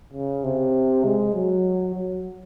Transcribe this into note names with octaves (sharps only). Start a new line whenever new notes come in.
C#3
C3
G#3
F#3
F#3